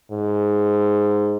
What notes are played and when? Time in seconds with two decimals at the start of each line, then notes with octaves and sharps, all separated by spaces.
0.11 G#2